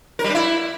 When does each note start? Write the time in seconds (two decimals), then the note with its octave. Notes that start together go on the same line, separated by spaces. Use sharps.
0.19 A#4
0.24 G3
0.29 D4
0.35 E4